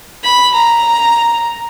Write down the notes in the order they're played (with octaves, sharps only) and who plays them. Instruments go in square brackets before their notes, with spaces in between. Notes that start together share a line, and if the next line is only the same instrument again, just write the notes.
[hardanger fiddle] B5
A#5